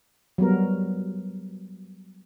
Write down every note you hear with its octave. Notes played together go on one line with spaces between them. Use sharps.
F#3 G3 B3 A#4